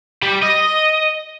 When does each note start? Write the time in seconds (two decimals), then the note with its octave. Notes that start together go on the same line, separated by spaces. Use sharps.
0.23 G3
0.43 D#5